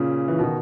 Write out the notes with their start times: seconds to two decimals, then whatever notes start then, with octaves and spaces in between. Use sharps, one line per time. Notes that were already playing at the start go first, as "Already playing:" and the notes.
Already playing: A#2 C#3
0.28 E3
0.39 B2 D#3